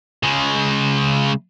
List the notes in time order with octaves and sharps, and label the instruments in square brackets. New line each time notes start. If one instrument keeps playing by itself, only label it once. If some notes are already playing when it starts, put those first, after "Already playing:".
[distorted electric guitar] C#3 G#3